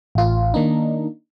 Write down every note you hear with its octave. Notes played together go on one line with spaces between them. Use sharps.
A1 F4
D#3 A#3 D4 D#4